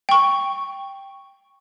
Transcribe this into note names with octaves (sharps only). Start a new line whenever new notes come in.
G5 C#6